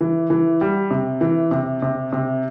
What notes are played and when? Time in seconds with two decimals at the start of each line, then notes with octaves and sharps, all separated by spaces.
0.01 E3
0.30 E3
0.61 G3
0.91 C3
1.21 E3
1.51 C3
1.82 C3
2.13 C3